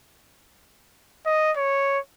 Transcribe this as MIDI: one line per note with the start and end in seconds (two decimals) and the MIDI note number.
1.26 1.52 75
1.57 1.99 73